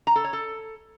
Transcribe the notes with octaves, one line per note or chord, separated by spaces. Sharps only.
A#5
A4
C#5
A4